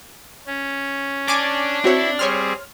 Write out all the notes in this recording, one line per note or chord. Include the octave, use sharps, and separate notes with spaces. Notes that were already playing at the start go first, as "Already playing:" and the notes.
C#4
D5 G#5 A5 C#6 D6
C4 E4 F#4 C#5
G3 C4 G#4 C#5 C6 F6